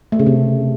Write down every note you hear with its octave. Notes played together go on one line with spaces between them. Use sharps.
A3
C#3
C3